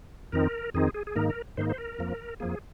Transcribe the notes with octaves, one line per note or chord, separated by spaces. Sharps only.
F2 D#3 C4 D#4 A#4
F2 D#3 C4 D#4 G#4
G#4
G#4
G#2 D#3 A#3 D#4 A#4
A#4
G#2 D#3 A#3 D#4 C5
C5
A#4
F2 F3 A#3
F2 F3 A#3 G#4